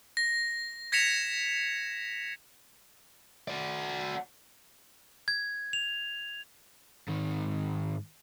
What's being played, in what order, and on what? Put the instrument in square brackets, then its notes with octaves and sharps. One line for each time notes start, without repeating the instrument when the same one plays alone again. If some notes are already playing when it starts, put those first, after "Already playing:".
[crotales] A#6
G#6 A#6 B6 C#7 E7 F7
[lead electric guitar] F#4 D5
[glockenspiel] G#6
F7
[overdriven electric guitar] G#2 D#3